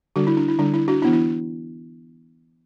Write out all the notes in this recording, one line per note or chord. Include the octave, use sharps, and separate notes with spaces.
D3 G3 D4 F#4
E4
D4
E4
D3 G3 D4
E4
D4 F#4
E3 B3 D4 E4
E4